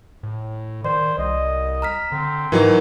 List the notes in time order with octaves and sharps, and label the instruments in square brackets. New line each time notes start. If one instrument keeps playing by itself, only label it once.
[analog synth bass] A2
[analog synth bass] D#3 [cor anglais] C5 [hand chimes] D5
[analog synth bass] C2 [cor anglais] D#5
[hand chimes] A#5 F6 B6
[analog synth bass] D3 [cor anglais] C4
[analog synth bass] G#2 [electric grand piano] E3 F#3 D#4 [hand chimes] A#4